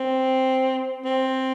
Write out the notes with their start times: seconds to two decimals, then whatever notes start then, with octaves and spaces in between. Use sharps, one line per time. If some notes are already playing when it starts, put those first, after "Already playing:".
Already playing: C4
1.05 C4